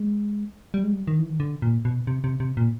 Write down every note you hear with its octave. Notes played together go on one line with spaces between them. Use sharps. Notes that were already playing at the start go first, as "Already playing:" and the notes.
Already playing: G#3
G3
G#3
G3
D#3
E3
D#3
D3
A#2
B2
C3
C3
C3
A#2